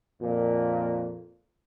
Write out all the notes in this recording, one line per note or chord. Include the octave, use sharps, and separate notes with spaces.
F2 A#2